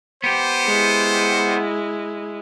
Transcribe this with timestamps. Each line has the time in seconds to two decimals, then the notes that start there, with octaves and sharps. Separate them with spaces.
0.24 B3 G4 C5
0.67 G#3 E4